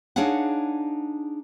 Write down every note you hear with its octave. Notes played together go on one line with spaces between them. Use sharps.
D4 D#4 G#4 C#5 F5 F#5